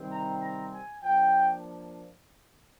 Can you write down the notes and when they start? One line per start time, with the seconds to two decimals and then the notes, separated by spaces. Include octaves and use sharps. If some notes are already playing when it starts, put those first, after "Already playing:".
Already playing: C3 D#3 G3 C4
0.10 A#5
0.42 A#5
0.72 G#5
1.03 F3 A#3 D4 G5